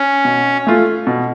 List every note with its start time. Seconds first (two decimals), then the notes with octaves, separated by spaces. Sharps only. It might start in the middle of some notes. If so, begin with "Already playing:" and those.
Already playing: C#4
0.25 B2
0.67 A3 F4
1.07 B2